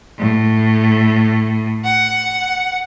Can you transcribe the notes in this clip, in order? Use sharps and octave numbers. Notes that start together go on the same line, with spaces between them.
A2
F#5